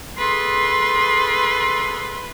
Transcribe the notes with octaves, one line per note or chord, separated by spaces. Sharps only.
G#4 A4 B4 C6